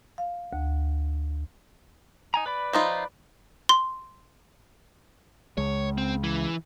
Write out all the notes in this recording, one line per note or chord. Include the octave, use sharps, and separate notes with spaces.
F5
D2
D#4 G#5 A#5
B4 D5 B5
F3 D#4 F4
C6
C#2 G#3 C#5
C4
E3